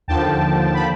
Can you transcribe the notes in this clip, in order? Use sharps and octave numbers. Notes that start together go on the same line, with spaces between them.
D#2 D3 F3 G5 A5
B5